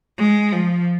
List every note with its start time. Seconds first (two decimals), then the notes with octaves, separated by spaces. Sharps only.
0.19 G#3
0.53 F3